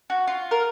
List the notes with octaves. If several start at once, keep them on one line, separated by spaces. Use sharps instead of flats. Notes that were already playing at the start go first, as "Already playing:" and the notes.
F#4
F4
A#4